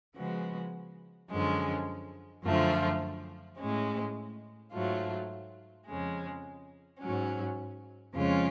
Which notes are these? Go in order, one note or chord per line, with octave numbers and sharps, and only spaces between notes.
C#3 F3 G#3 B3 F#4
F#2 D3 F3 G#3 C#4
F#2 D3 F3 A3 F4
A2 G#3 C#4
G#2 F#3 A3 F4
F2 C#3 G#3
G#2 F#3 C#4
F2 C#3 G#3 C#4 F4